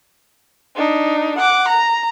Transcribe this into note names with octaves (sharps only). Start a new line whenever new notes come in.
D4 D#4
F#5 D6
A#5